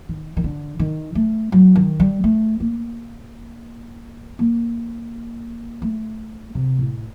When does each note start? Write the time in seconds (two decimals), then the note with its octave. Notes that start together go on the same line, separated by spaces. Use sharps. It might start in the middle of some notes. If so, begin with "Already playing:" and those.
0.09 D#3
0.37 D#3
0.44 D3
0.79 D#3
1.15 A3
1.52 F#3
1.76 D#3
2.00 G3
2.24 A3
2.60 A#3
4.39 A#3
5.82 A3
6.55 C3
6.79 A2